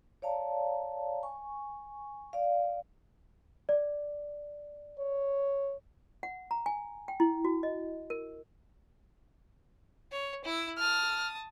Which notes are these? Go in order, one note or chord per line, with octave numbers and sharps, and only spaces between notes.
C#5 D5 F5 A5 A#5
G#5 C#6
D5 F5
D5
C#5
F#5
A#5
G#5
G5
E4
F#4
D#5
A#4
C#5
E4 E6
A5 D#6 F6